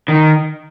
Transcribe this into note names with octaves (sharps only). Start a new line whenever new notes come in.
D#3